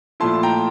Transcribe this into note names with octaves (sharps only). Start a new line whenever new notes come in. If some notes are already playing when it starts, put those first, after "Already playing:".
A#2 F3 A3 E4 A5 C6
G5 A#5